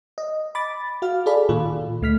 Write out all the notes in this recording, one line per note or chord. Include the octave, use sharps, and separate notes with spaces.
D#5
B5 D6 A6
F#4 F5 F6
G#4 A4 D5 B5
A#2 D#3 F4
D2 A3 F6 B6